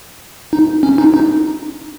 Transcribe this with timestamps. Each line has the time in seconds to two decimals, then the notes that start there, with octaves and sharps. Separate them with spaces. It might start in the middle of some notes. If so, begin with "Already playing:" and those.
0.53 D#4
0.83 C#4
0.98 D#4
1.14 D#4